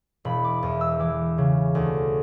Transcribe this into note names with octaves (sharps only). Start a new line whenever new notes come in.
E1 B5
D6
E2
E6
E6
E3 D6
C#3
D2